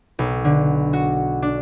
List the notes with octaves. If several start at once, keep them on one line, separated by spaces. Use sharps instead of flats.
B1
D3
F#4
D4